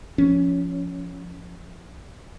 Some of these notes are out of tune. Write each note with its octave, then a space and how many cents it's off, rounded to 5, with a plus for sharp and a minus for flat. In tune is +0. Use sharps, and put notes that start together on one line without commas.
F3 +0 C#4 +15